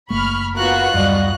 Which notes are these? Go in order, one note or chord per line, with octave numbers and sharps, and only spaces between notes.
F#1 A3 A#3 B5 C#6 F6
B3 F4 F#4 A#4 F#6
D1 F#2 G3 F#4 D#5